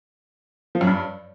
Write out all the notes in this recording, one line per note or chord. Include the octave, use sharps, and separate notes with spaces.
F3
F#2
G2